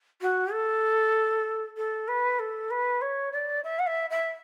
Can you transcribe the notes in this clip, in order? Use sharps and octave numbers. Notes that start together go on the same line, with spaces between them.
F#4
A4
A4
B4
A4
B4
C#5
D5
E5
F#5
E5
E5